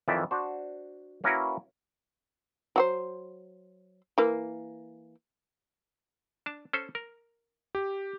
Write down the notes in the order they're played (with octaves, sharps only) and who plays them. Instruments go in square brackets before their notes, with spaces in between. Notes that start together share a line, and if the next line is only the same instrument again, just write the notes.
[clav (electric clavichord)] F2 D#3 E3 D5 E5
D4 F#4 C5
A#3 C#4 E4 F#4 A#4 B4
[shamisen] F#3 F#4 C5
E3 A#3
[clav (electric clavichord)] D4 A5
C#4 A4 C5
A#4
[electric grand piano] G4